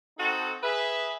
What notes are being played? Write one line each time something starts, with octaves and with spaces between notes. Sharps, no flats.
C4 D#4 F#4 A4
G#4 B4 E5